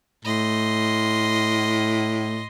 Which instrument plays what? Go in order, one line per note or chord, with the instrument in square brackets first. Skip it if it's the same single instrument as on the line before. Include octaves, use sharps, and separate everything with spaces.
[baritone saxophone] A2 [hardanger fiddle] D#5 C6